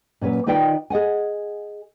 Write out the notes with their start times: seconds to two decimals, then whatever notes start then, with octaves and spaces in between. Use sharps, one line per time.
0.21 A#2 F#3 C#4 B4
0.46 D#3 D#4 F4 B4 D5 G5
0.90 G#4 D#5 F#5 G#5